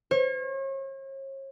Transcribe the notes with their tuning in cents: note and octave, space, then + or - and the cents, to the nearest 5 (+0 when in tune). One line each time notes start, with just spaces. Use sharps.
C#5 -40